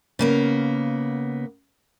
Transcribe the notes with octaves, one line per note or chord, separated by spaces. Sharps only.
C#3 A#3 B3